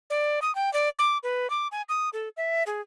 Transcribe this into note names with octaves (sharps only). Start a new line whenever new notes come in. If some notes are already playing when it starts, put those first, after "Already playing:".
D5
D#6
G5
D5
D6
B4
D6
G#5
D#6
A4
E5
G#4